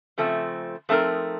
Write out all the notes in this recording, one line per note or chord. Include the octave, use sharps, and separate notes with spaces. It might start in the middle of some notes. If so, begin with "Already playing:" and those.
C#3 F3 A3 C4
F3 A3 C4 D#4 A#4